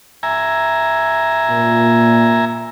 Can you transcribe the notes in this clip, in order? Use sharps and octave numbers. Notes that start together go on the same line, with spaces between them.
E5 G#5 A#5
A#2